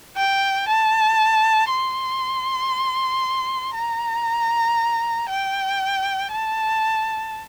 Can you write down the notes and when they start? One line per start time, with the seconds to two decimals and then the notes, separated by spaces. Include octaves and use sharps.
0.17 G5
0.68 A5
1.70 C6
3.75 A#5
5.29 G5
6.31 A5